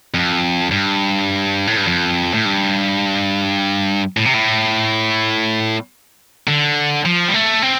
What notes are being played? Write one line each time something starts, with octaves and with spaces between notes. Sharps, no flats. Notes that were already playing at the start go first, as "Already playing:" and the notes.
F2
G2
A2
G2
F2
A2
G2
A2
C3
A2
D3
F3
G3
A3
C4